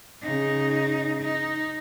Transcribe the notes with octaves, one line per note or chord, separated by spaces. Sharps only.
C#3 D#4
D#4